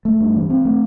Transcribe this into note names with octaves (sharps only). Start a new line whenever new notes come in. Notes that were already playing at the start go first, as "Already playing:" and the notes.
A3
G2
E3
C4
A3